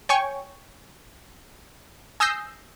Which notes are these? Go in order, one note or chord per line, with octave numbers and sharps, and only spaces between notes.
C#5 G5 G#5 C#6
G#5 D#6 E6 G6 A#6 C7